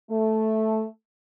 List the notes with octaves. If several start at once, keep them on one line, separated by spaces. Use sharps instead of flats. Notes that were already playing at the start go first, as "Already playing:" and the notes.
A3